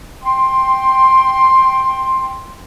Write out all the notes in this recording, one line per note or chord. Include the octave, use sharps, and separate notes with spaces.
G5 C6